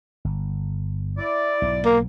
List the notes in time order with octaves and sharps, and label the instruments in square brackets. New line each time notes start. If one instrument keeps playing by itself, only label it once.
[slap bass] G1
[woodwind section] E4 D5
[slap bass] B1 G#2
[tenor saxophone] A#3